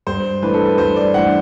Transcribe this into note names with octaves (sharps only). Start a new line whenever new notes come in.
G2 C5
E3 A3 D4 B4
A4
B4
G2 C5
D5
E3 A3 D4 F#5